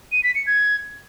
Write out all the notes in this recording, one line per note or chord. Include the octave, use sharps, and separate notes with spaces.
D#7
B6
C#7
G#6